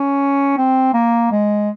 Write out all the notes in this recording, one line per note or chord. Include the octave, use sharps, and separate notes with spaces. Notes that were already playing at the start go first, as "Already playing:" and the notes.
Already playing: C#4
C4
A#3
G#3